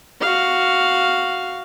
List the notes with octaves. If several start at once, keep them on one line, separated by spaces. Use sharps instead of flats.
F#4 F5